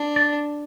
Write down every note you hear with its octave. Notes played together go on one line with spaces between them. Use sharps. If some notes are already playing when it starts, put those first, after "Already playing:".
Already playing: D4
D5